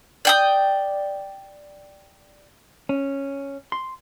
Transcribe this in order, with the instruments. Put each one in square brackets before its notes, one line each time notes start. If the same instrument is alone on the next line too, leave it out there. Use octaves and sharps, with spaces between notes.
[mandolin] D5 G5 D#6
[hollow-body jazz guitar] C#4
C6